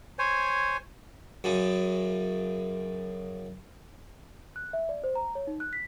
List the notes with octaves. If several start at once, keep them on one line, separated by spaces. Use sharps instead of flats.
C5 C#5 G#5
F#2 C#3
F#6
E5
D5
C5
A#5
C#5
D#4
F#6
B6